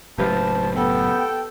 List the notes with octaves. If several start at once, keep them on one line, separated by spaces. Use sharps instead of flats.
F#1 F#2 A2 G4 B4 C5 F5 A5
B3 A4 G5